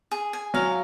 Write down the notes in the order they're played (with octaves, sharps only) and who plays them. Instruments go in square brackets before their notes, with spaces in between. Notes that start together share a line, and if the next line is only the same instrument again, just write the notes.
[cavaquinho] G#4
G#5
[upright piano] F#3 [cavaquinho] F5